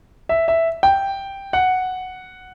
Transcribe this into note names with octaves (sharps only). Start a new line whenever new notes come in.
E5
E5
G5
F#5